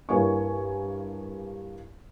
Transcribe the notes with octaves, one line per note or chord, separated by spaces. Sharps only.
G2 A#3 E4 C#5 G#5 C#6